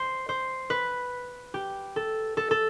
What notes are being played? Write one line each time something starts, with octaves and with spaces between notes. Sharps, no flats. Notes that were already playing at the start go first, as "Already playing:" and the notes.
Already playing: C5
C5
B4
G4
A4
A4
A4